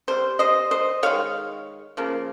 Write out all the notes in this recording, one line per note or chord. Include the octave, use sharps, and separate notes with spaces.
C3 G3 C5
C5 D#5
C5 D#5
D#3 G#3 C#5 F5
C#3 F3 A#3